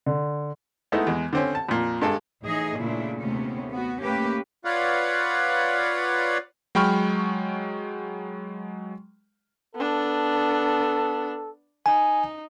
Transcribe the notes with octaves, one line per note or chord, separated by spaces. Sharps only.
D3
G#3 A3 B3 D#4 E4
E2 G#3
D3 C4 C#4
A5
F2 A#2
G2 G#3 A4
A2 E3 D#4 G#4 D#5
A#2 C#3 A3 D4 E4
D#2 C3 A3 B3 C#4
B3 F#4
A3 A#3 C#4 G4 B4
F4 B4 C#5 D5 F5 F#5
F#3 G#3 G5 B5 C#6 F6
B3 D4 A4
D#4 G#5